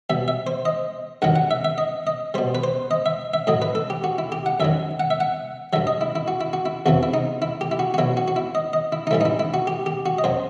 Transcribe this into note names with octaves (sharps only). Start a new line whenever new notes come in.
B2 G3 E5
E5
C5
D#5
G2 D#3 F#3 F#5
F#5
E5
E5
D#5
D#5
B2 G3 C5
B4
C5
D#5
E5
E5
A2 F#3 D#5
B4
A4
G4
F#4
E4
G4
F#5
F#2 D#3 F#3 E5
F#5
E5
F#5
G2 F#3 E5
D#5
E4
E4
F#4
E4
F#4
E4
E2 C3 E3 F#4
E4
D#4
E4
G4
E4
F#4
F#4
B2 F#3 E4
F#4
F#4
E4
D#5
D#5
E4
D#4
A2 E3 G3 E4
D#4
E4
E4
F#4
G4
G4
F#4
D#5
F#2 F#3 C5